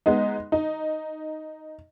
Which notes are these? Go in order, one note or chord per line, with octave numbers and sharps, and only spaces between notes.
G#3 B3 D#4
D#4